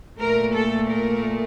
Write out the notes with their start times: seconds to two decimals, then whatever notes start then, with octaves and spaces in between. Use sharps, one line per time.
0.20 A#2 A3 A#4
0.54 A4
0.90 A#4